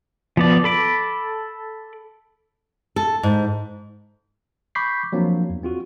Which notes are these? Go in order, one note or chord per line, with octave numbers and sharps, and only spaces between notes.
F3 B3 D5
A4 B5 D6
A4
G#2
B5 C#6 D6 G6 B6 C7
F3 F#3 A#3 C4 D4
E2
C4 F4 F#4